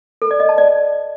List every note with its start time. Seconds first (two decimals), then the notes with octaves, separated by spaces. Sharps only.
0.22 A4
0.31 D5
0.40 D#5
0.49 A5
0.58 D5